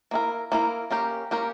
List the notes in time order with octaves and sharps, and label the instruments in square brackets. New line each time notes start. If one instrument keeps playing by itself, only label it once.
[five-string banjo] A#3 E4 A#4
A#3 E4 A#4
A#3 C#4 G4 A#4
A#3 C#4 G4 A#4